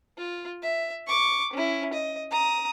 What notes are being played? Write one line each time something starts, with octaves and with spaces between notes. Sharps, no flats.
F4
E5
C#6 D6
C#4 E4
D#5
A#5 D#6